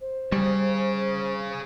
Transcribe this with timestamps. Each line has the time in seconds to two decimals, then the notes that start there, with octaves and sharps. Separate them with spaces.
0.01 C5
0.32 G3 G#4 C#5